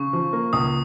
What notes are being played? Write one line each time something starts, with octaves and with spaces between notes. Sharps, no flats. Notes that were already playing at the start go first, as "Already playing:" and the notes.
Already playing: C#3 C#6
F3
A#3
C#2 D#6